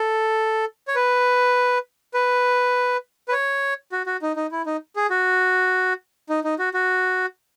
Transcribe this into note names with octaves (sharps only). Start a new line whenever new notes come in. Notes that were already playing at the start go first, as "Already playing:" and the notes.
Already playing: A4
C#5
B4
B4
B4
C#5
F#4
F#4
D#4
D#4
E4
D#4
G#4
F#4
D#4
D#4
F#4
F#4